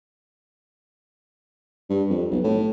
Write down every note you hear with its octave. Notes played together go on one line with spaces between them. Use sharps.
G2
F2
B1
A2